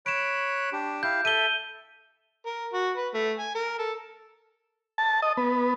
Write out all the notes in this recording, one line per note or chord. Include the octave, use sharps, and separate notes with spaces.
C#5 B5 F#6 D7 E7
D4 G4
E4 G4 F5 G6
A4 E5 D#7 G7
A#4
F#4
B4
A3
G#5
A#4
A4
A5
D#5
B3